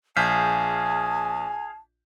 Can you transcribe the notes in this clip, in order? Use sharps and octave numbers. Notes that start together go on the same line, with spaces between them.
A#1 G#4 F5 G#5 A5 G6 B6